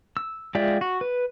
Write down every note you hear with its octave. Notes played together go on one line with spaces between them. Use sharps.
E6
G#3 F4 D5 E5 G5
F#4
B4